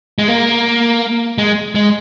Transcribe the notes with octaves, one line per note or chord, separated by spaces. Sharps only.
G#3
A#3
G#3
G#3